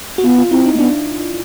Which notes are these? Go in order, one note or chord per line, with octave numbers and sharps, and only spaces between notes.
F#4
B3 F4
F4
C4 E4
D#4
A#3
B3 D4